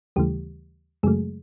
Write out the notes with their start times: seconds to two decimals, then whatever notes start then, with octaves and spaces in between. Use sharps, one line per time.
0.16 D#2 C#3 E3 G3 A3 G4
1.03 F#2 C#3 F#3 G#3 A3 G#4